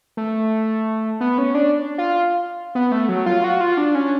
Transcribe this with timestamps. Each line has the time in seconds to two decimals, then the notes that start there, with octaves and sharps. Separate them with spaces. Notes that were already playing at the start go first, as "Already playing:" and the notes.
0.17 A3
1.21 B3
1.38 C#4
1.55 D4
1.98 F4
2.75 B3
2.92 A3
3.09 F#3
3.26 F4
3.44 F#4
3.61 F4
3.77 D4
3.95 C#4